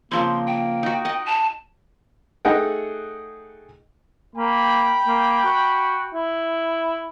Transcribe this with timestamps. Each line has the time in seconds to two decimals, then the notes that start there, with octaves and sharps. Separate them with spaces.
0.12 C#3 F3 A#3 C4 C6
0.47 G5
0.83 D#4 F#4
1.05 D#5 F#5
1.26 A5
2.45 A3 D#4 G#4 D#5 F#5 G5
4.36 A#3 G5 B5
5.07 A#3
5.45 F#4
6.14 E4